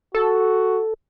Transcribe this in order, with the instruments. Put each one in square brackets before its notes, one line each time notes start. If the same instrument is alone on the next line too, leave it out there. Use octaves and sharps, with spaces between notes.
[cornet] F#4 [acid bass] A4